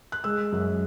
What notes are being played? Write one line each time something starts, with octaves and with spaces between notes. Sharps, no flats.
F#6
G#3 E6
F#2